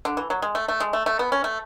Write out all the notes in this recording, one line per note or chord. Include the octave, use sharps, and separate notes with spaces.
D3
E3
F#3
G#3
A3
A3
G#3
A3
A3
B3
C#4
A3